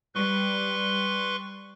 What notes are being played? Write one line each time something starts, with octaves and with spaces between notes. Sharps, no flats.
G3 B4 C6 C#6